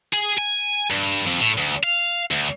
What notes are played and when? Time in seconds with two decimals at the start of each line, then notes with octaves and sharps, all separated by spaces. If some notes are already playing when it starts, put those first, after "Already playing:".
0.13 G#4
0.38 G#5
0.91 G2
1.26 F2
1.40 A2
1.58 D2
1.84 F5
2.31 D2